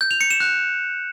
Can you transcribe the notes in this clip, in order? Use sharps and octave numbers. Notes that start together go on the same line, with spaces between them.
G6
F7
C#7
E7
F#6